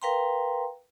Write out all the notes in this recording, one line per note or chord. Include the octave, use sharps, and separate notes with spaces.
A#4 B4 F5 G5 A#5 C6